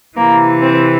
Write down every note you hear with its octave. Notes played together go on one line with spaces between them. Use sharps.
C3 E3 A#3
C4